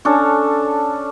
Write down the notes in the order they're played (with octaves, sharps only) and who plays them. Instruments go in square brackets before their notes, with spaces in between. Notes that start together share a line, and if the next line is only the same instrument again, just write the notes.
[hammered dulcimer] C#4 D4 A4